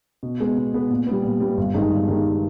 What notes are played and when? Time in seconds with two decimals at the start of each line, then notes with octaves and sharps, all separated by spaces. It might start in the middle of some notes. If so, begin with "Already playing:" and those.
0.23 B2
0.40 G#3 B3
0.57 B2
0.74 G#3 B3
0.90 A#2
1.07 G3 B3
1.24 A#2
1.40 G3 B3
1.57 G1
1.74 G2 D#3 G#3 D#4
1.91 G1
2.08 G2 D#3 G#3 D#4